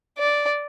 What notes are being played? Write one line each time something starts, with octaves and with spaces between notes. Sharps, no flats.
D5